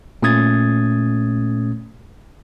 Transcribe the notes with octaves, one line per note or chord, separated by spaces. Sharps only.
A#2 A3 C#4 D#6 G#6 A6